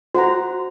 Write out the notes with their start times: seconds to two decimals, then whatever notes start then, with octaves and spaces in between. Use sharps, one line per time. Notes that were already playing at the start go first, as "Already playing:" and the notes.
0.14 F#4 C5 F#5 A#5